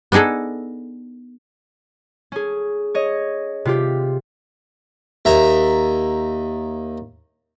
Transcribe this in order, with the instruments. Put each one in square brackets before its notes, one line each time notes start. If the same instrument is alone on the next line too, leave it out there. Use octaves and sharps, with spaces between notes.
[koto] B3 D4 D#4 G#4 A4
[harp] C#4 G#4
C#5 D#5
C3 F4 G4
[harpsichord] D#2 E5 A#5